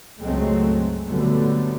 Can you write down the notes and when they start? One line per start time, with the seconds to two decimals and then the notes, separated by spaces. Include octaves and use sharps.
0.20 C#2 G2 F#3 G#3 A3 C4
1.06 A#2 D3 F#3 G3 A3 B3